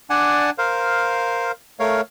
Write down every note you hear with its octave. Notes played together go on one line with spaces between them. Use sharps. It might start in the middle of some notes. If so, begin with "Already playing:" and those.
D4 D5 F#5 G#5 A5
A#4 C5 F5
A3 A#4 C#5 F5